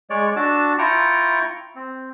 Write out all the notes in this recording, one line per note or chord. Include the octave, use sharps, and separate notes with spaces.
G#3 C#5 D5
D4 F#4 A5 E6
E4 F4 G5 A#5 C#6
C4